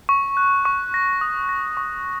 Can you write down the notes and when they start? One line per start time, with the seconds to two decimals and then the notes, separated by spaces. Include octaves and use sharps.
0.09 C#6
0.37 F#6
0.65 C#6
0.94 A#6
1.21 D#6
1.49 A#6
1.77 C#6